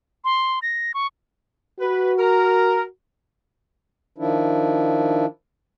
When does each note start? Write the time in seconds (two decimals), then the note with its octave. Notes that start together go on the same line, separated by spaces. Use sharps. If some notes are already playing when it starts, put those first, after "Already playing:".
0.25 C6
0.62 A#6
0.94 C#6
1.80 F#4 B4
2.18 A#4 A#5
4.18 D#3 F3 D4 E4